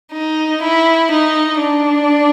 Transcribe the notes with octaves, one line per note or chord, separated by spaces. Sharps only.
D#4
E4
D#4
D4